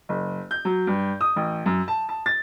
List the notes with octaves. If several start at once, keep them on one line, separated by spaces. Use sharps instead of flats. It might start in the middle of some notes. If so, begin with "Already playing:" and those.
F#1
G6
F#3
G2
D#6
A1
F#2
A5
A5
A6